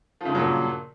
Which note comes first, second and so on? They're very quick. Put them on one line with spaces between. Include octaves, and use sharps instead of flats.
F3 C#3 G2 F#3 A#2